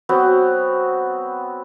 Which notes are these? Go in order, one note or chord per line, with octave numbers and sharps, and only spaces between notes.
F#3 B3 C4 F#4